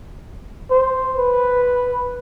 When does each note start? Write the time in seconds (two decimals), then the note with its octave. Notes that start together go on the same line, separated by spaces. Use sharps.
0.71 C5
1.18 B4